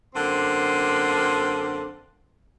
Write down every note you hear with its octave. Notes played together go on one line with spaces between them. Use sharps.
F#2 D3 A#3 C4 C6